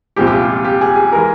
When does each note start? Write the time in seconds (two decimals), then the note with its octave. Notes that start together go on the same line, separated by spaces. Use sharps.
0.16 C2 A#2 F3 G#3 G4
0.27 G4
0.33 F4
0.49 F4
0.65 G4
0.81 G#4
0.96 G#4
1.13 E3 G#3 A#4